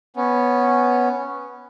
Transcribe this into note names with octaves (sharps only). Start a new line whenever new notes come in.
B3 C#4